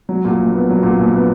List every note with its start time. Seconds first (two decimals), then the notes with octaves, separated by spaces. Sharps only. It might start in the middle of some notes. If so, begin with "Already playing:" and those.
0.09 F#3
0.25 A#2
0.40 A#1
0.54 B3
0.69 F#3
0.83 A#2
0.99 A#1
1.13 B3